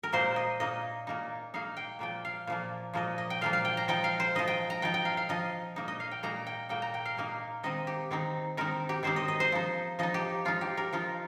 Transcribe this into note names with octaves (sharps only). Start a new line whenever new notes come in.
A#4
A#2 A#3 D#4 C5
D#5
A#2 A#3 D#4 D#5
A#2 A#3 D#4
A#2 A#3 D#4 F5
G5
A#2 F3 A#3 G5
F5
A#2 F3 A#3
A#2 F3 A#3 D#5
D#5
G5
A#2 F3 A#3 F5
F5
G5
A#5
F3 D#4 G5
F5
C5
F3 D#4 D#5
G5
A#5
F3 D#4 G5
G5
F5
F5
F3 D#4 D#5
A#2 A#3 D#4
D#5
F5
G5
A#2 A#3 D#4 A#5
G5
A#2 A#3 D#4 G5
A#5
G5
F5
A#2 A#3 D#4
D#3 C4 D#4 D#5
G4
D#3 C4 D#4
D#3 C4 D#4 A#4
G4
D#3 C4 D#4 C5
D#5
D#5
C5
F3 D#4
F3 D#4 D#5
G4
F3 D#4 F4
G4
A#4
F3 D#4 F4